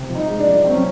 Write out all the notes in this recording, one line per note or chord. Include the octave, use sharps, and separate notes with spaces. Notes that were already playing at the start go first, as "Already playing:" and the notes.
Already playing: C3
F3
D#4
G#3
D4
F3
F#3 C4
C#4